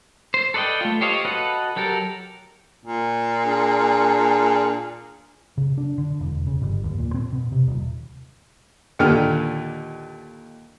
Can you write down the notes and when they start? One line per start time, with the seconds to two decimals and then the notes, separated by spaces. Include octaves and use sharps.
0.34 C5
0.54 A4 B4 D5 D#5 G5
0.81 A3 F4
1.01 G4 C5 C#5 D#5 F5
1.25 F#4 A4 B4 D#5
1.76 F#3 G4 A4 A#4
2.85 A#2
3.45 D4 G#4
5.57 C#3
5.78 D4
5.98 D3
6.20 E1
6.47 C#3
6.61 G1
6.84 D#2
6.98 A#2
7.14 C4
7.33 B2
7.52 C3
7.68 D#1
8.99 D#2 A#2 D3 F6